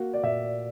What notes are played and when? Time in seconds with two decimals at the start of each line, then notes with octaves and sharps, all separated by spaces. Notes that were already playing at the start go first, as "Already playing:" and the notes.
Already playing: A#3 F#4
0.14 D5
0.23 A#2 E5